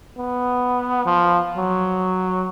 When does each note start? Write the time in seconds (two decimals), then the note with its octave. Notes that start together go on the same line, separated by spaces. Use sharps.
0.18 B3
1.05 F3
1.57 F#3